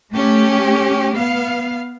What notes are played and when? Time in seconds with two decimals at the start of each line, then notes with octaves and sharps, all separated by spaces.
0.12 A3 C#4 G4
1.13 B3 F5